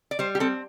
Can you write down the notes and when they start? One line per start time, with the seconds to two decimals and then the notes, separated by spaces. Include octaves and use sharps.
0.11 D5
0.19 G3 C5
0.35 G4
0.40 C4 A4